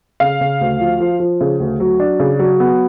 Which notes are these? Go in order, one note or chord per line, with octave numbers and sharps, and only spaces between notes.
C#3 F5
C#3
D2
F3
F3
F3
C#3
D2
F#3
D4
C#3
F#3
B3